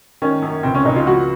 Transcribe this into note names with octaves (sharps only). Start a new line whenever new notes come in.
D#3 C#4
F#2
C#2 C4
C#4
C#2 D#4
F4
F3 F#4